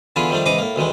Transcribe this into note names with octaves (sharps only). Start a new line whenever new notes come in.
D3 E3 B3 E4 F4 G#4
D#3 F3 G3 A3 D4
G#2 C#3 E3 D#5 D6 D#6
A2 A#3
D2 D#3 E3 G#3